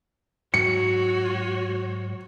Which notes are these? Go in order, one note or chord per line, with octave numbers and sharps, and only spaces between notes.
G#2 F#3 F#4 C#5 C#7